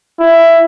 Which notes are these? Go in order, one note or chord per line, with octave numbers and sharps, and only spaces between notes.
E4